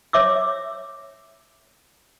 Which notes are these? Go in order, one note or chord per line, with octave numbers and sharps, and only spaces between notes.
C#5 E5 D6 E6